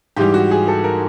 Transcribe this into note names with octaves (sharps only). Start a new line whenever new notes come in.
G#2 E3 G3 G4
F#4
G#4
A4
A#4